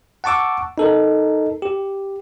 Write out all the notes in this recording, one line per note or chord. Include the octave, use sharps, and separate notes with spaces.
F#5 A5 C#6 D6 E6
D#4 A4 A#4
G4